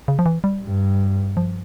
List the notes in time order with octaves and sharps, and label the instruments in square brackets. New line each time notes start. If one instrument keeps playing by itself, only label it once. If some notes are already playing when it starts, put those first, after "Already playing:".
[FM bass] C#3
F3
E3
G3
[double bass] G2
[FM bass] F3